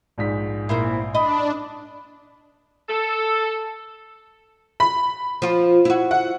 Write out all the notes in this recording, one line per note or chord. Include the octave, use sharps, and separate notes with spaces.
A#1 G#2 B6
A#2 A#3 C4 E4
D4 D#5 B5 D#6
A4
B5
F3 F4
E4 F#4
F#5